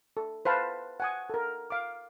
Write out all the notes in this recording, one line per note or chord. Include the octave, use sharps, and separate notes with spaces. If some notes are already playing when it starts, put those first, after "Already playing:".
A4
B4 C5 F5 A5 B5
F#5 G#5 D#6
A4 A#4
F5 D6